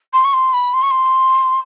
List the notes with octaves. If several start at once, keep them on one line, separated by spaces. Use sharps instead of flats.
C6
C#6
C6
B5
C6
C#6
C6